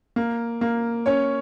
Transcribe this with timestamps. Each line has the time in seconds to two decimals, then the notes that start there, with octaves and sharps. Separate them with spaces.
0.16 A#3
0.61 A#3
1.06 C#4 C#5